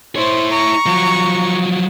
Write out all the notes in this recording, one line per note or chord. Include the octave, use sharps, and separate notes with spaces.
E4 C5 C#5
A#5 C#6
F3 F#3